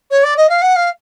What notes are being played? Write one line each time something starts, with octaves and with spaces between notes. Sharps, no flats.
C#5
D5
D#5
F5
F#5
F5